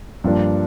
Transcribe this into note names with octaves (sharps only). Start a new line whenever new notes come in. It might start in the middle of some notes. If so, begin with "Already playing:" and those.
G2 F3 A#3 D4